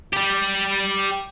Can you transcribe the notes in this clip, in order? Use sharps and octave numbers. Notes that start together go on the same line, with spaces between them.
G3 G4